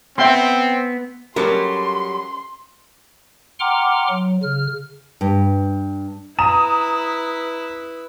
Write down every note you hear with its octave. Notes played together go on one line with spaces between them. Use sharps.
B3 C4 E5 G5 C6
F#3 G3 C#4 A4 A#4 C6
F#5 G5 A#5 C6 D6 F6
F#3
C#3 F6
G2
E4 B4 A#5 D#6 E7